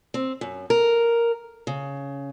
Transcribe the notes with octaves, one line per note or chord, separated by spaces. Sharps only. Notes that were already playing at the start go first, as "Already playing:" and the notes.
C4
F#2
A#4
C#3